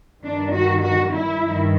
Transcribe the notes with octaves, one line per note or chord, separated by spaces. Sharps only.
G2 D#3 D4
F#4
F#4
E4
G2 D#3